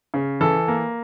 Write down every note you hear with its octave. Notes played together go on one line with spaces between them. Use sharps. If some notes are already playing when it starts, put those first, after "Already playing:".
C#3
E3 A4
A#3